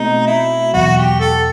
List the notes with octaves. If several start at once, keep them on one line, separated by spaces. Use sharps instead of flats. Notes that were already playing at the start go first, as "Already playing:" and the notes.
Already playing: B2 A3 C4 D#4 F#4
E4
E2 B2 F#3 F#4
G4
A4